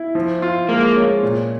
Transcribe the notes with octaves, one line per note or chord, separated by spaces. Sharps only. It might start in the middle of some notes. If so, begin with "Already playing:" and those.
Already playing: E4
F3
F4
G#3 A#3
C#4
A#2